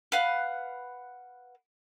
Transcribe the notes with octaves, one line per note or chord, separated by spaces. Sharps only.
B4 F5 F#5